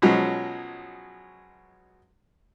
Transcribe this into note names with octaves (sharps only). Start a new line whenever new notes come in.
B2 F3 F#3 G#3 C#4